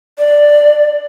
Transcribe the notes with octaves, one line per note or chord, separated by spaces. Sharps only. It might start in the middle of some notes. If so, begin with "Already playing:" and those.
D5